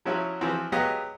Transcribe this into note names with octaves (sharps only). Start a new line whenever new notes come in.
F3 F#3 C#4 E4 F#4
E3 F3 C4 F#4
F#3 G#3 B3 G4 D#5 F5